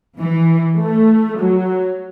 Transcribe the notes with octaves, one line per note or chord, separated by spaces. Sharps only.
E3
A3
F#3